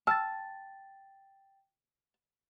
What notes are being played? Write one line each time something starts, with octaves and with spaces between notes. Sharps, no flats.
G5 A5 E6 F6 A6